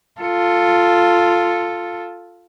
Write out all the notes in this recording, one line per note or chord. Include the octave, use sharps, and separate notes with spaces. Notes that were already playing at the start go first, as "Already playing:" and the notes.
F4 A4